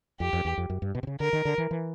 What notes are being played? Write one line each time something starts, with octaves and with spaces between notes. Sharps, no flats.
F2 G4
F2
E2
F2
F#2
G2
B2
C3
C#3
D3 A#4
D#3
D3
E3
E3